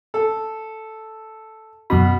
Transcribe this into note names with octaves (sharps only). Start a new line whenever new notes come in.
A4
F#2 B2 B5